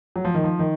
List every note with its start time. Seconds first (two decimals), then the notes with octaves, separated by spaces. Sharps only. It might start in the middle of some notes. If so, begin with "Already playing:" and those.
0.16 F#3
0.25 F3
0.35 D#3
0.44 F3
0.59 D#3